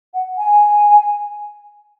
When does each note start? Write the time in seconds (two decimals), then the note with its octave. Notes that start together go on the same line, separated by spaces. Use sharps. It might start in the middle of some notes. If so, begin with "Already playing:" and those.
0.14 F#5
0.38 G#5